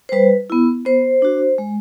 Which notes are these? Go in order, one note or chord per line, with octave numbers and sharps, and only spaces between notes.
C5
G3 B4
B3 E4
B3 C5
D4 F#4
G#3